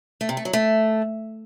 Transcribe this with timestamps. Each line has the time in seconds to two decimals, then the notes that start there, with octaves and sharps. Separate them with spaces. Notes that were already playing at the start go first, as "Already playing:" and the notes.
0.21 A3
0.29 C3
0.37 A3
0.45 F#3
0.53 A3